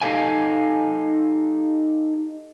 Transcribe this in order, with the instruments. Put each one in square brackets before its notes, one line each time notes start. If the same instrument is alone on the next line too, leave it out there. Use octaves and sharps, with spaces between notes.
[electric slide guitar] D#4 G4 A4 F5 G#5